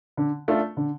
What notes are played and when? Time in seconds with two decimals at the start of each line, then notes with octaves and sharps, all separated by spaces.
0.17 D3
0.48 A3 D4 F4
0.77 D3